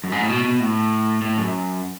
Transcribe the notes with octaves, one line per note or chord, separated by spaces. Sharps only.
F#2
G#2
A2
B2
B2
A2
A2
F#2